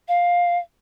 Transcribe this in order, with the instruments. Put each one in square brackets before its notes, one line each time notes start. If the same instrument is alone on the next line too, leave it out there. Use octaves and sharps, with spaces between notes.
[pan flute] F5